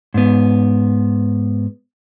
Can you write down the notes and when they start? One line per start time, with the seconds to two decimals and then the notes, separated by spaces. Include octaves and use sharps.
0.14 G#2 B3